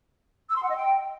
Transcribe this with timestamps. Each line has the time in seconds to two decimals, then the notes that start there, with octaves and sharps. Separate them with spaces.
0.49 E6
0.56 C6
0.62 F#5
0.69 D#5
0.76 G5